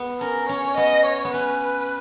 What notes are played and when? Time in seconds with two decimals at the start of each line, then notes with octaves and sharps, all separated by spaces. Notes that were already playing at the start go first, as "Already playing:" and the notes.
Already playing: B3
0.21 C#4 A#4
0.49 C#4 C#5
0.77 B3 D#5
1.06 C#5
1.24 B3
1.34 C#4 B4
1.63 B4